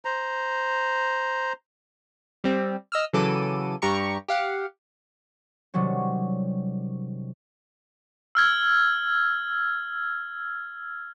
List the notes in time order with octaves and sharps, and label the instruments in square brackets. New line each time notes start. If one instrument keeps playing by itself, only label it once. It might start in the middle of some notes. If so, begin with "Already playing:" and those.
[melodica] C5 A#5
[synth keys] G3 C4
D#5 E6 F6
C#3 E3 F#3 A4 D6 D#7
G2 G4 A#5 C#6 C#7
G4 F5 F#5
[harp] C3 D#3 F#3 G3 C#4
[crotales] E6 F6 G#6